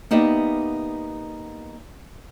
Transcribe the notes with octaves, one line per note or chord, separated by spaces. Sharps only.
A#3 B3 D#4 G4 D5 E5